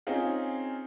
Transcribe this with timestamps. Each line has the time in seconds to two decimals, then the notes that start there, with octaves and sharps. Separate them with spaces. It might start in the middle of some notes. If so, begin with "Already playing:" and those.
0.07 C4 C#4 D#4 F4 G#4